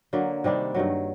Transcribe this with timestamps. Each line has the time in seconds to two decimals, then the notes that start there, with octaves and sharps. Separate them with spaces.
0.13 D3 F#3 A#3
0.44 C3 D#3 G3 D4
0.75 G2 D#3 F#3